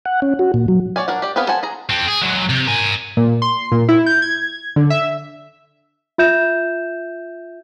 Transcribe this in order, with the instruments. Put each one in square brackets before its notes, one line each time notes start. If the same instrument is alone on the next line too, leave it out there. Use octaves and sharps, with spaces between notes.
[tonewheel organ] F#5
C#4
F#4
A#2
F#3
[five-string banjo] F#4 C#5 D5 G#5
D4 A#4 F#5
G4 D5
B3 C4 G#4 B4 F5
A4 C5 F#5 G#5
G#4 A#5
[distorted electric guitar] C4 A4
G#4
F#3 G#3
C3
A#4 G#5
[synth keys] A#2
C6
A#2
E4
G6
G#6
D3
E5
[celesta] F4 E5 G6 E7